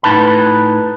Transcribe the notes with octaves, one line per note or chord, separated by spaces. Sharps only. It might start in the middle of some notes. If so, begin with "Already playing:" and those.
A2 D#4 B4 A5 B5